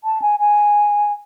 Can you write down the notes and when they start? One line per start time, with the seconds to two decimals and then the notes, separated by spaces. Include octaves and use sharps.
0.04 A5
0.22 G#5
0.40 G#5